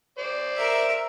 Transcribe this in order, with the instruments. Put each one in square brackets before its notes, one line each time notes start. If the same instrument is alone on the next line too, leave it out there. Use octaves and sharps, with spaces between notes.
[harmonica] C5 D5
[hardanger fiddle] A#4 E5